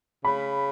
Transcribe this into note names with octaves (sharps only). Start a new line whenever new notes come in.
C#3 B5